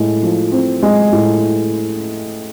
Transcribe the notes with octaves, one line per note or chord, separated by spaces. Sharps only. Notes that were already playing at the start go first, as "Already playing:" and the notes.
Already playing: A2 G#3
F3
C4
G#3
A2